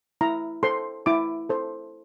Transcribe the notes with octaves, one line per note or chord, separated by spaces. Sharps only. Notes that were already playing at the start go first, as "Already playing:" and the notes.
E4 A#5
A4 C5 C6
E4 D6
A4 C5